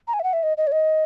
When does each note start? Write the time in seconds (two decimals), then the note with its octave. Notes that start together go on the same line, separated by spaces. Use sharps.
0.08 A#5
0.14 G#5
0.20 E5
0.23 F#5
0.33 E5
0.43 D#5
0.57 D#5
0.67 C#5
0.72 D#5